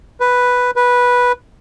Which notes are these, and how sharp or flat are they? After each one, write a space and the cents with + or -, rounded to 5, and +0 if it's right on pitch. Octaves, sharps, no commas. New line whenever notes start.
B4 +0
B4 -10